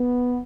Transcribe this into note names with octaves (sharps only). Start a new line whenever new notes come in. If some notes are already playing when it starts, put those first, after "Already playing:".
Already playing: B3